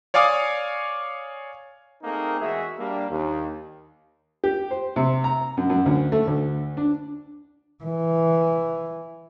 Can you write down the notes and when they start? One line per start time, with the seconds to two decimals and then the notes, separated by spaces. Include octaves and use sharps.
0.14 C#5 D5 F5 G#5 D6 D#6
2.03 A3 A#3 C4 D#4 G#4 A#4
2.40 E2 G#3 F#4 G#4 E5
2.79 G3 A#3 D4
3.10 D#2
4.44 G4
4.71 C5
4.96 C3
5.24 A#5
5.57 F#2
5.70 F#2
5.86 D2
6.12 A3
6.27 D2
6.77 D4
7.84 E3